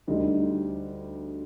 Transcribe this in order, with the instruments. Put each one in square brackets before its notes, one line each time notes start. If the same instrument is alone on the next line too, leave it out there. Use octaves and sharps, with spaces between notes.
[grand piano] D2 D3 G3 D#4